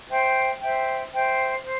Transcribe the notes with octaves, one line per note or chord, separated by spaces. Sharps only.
C5 E5 G5
C5 E5 G5
C5 E5 G5
C5